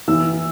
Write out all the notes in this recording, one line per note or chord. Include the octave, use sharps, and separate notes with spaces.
E3 E6